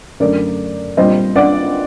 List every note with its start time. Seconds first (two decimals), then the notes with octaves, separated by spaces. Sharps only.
0.20 F#2 D3 A3 A#4 D5
0.97 A#2 G3 C4 C5 D#5
1.36 D5 F#5